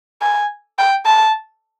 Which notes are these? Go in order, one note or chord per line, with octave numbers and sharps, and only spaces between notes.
G#5
G5
A5